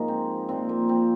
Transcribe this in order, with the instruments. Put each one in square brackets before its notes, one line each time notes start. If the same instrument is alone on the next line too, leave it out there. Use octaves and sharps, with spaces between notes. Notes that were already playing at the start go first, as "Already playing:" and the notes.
Already playing: [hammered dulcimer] G#2 F3 A#3 D#4 F4 G#4 A#4
C4
A#2 F3 C4
A#3
C4